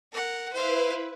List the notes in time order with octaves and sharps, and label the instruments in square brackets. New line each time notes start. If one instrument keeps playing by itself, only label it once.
[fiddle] A#4 F#5
[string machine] E4 B4 [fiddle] C5 F5